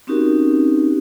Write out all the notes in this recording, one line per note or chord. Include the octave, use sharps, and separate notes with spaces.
C4 C#4 D#4 F#4 G4 A#4